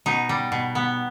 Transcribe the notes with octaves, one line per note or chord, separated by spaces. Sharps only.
B2 D#4
G3
B2
B3